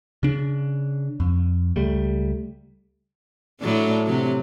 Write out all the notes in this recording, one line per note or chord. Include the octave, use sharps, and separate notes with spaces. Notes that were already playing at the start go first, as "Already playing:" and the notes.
C#3 D4
F2
C#2 G3 A3
A2 F#3 D4
C3 F#3